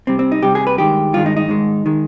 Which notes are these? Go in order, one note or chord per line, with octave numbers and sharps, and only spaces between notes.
C3 G3 C4
C4
D#4
C3 G3 G4
G#4
B4
G2 D#3 G#3 G4
G2 D#3 G#3 F4
D#4
D#4
G#2 D#3 G#3
D#3 G#3